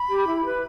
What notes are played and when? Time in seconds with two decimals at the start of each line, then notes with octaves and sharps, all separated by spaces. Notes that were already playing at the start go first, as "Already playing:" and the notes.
Already playing: B5
0.09 G4
0.27 E4
0.45 B4